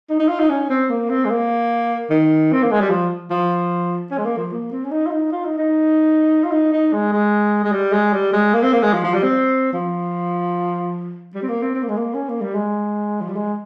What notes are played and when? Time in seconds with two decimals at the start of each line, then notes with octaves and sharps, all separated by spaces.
0.09 D#4
0.20 D#4
0.28 F4
0.40 D#4
0.49 C#4
0.70 C4
0.90 A#3
1.10 C4
1.25 G#3
1.30 A#3
2.10 D#3
2.52 C4
2.62 A#3
2.71 G#3
2.81 G3
2.90 F3
3.30 F3
4.11 C#4
4.18 G#3
4.25 A#3
4.37 F3
4.52 A#3
4.72 C4
4.84 C#4
4.91 D#4
5.06 F4
5.11 D#4
5.32 F4
5.45 D#4
5.58 D#4
6.44 F4
6.52 D#4
6.73 D#4
6.93 G#3
7.13 G#3
7.64 G#3
7.72 G3
7.92 G#3
8.13 G3
8.33 G#3
8.53 A#3
8.63 C4
8.73 A#3
8.83 G#3
8.93 F3
9.04 F3
9.14 G3
9.23 C4
9.73 F3
11.35 G3
11.42 C4
11.48 A#3
11.62 C4
11.74 C4
11.82 A#3
11.88 G#3
11.97 A#3
12.14 C#4
12.29 A#3
12.41 G3
12.55 G#3
13.21 F3
13.29 G3
13.36 G#3